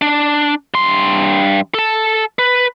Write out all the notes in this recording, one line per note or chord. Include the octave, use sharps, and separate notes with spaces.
D4
G2 C6
A4 A5
B4